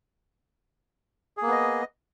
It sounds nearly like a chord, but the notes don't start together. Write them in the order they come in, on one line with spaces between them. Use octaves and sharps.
G#4 A#3 B3 D#5